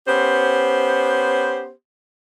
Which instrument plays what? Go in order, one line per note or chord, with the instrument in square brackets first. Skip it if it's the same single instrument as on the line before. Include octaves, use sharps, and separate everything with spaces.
[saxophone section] B3 C#4 G4 C5